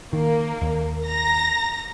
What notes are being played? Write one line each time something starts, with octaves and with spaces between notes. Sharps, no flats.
D#3 A#3
D#2
A#5 A#6